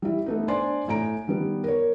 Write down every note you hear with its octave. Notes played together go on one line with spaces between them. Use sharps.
G3 E4
A3 B3 D#4
D4 C5 D5 G#5 C6
A2 G#5 A#5 D7
D#3 G3 B3
A#4 C#5